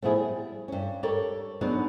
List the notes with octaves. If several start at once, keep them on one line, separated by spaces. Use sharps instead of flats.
A2 F3 B3 E4 G#4
G3
G2 C#4
G4 A4 A#4 C#5 D5
F#3 B3 D4 D#4 F#4 G#4